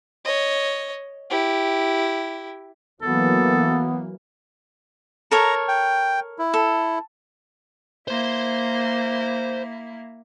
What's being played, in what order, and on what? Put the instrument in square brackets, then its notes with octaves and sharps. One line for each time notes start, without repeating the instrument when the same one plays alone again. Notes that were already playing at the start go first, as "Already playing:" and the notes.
[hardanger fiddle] C#5 D#5
E4 G4
[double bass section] E3 F#3 A#3 [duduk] B3 [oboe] A4
[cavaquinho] A4 A#4 C#5 [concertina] A#5
[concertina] G5
E4
[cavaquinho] A4
[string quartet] A#3 E4 [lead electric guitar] C5 C6